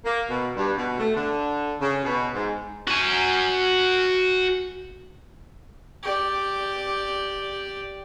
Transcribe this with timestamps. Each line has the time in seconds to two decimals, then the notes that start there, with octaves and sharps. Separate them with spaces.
0.05 A#3
0.29 B2
0.57 G2
0.77 B2
0.98 A3
1.15 D3
1.80 C#3
2.04 B2
2.34 G#2
2.87 F#4 G#5
6.03 G4 D5